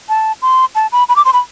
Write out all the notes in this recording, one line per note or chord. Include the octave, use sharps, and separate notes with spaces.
A5
C6
A5
B5
B5
D6
C6
B5